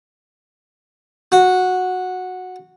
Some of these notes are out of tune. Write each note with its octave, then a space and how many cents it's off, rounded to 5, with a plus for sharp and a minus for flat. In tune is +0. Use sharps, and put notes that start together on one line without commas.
F#4 -10